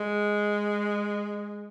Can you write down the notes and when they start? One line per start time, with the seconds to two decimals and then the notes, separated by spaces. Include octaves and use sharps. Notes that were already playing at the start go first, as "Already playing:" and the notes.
Already playing: G#3